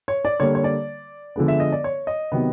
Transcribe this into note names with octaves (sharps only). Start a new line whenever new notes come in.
C#5
D5
D3 G3 A#3 C#5
C#5
D5
D3 F3 G#3 B3
E5
D#5
D5
C#5
D#5
C3 D#3 F#3 B3